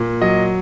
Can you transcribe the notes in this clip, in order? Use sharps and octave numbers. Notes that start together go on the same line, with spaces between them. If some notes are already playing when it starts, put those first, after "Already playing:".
Already playing: A#2
F#3 D#5